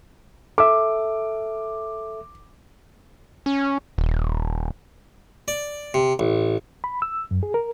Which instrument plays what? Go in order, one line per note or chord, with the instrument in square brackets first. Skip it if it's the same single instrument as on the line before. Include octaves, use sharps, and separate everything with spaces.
[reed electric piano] A4 E5 [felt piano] D6
[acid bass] C#4
D#1
[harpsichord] D5
C3
A1
[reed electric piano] B5
E6
F#2
G#4
A#4